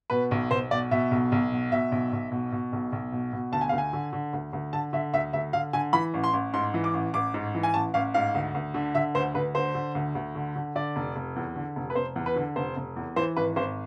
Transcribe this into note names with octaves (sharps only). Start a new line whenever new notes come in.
B2 B4
B1
B1 C5
B2 D5
B2 E5
B1
B1
B2
B2 E5
B1
B1
B2
B2
B1
B1
B2
B2
D2 A5
G#5
D2 F5
G#5
D3
D3
D2
D2
D3 A5
D3 E5
D2 E5
D2 E5
D3 F5
D3 G#5
E3 B5
A1
C6
A1
G#2 C6
E3
D6
A1
A1 D6
G#2
E3
G#5
A1 A5
A1 F5
G#2 F5
D2
D2
D3
D3 E5
D2 C5
D2 B4
D3 C5
D3
D2
D2
D3
D3
D3 D5
F1
F1
E2
D3
F1
B4
F1 C5
E2
B4
D3
F1 C5
F1
E2
E3 C5
G#1 B4
G#1 C5